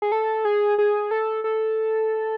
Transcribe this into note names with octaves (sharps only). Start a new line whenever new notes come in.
G#4
A4
G#4
G#4
A4
A4